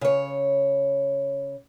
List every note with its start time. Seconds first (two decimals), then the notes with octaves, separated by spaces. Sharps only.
0.01 C#3 C#5